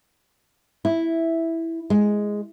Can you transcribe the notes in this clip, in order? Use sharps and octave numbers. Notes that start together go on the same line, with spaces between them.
E4
G#3